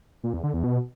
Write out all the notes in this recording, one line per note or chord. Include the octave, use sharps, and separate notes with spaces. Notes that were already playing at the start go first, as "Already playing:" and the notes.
A#2
E2
D3
E2
B2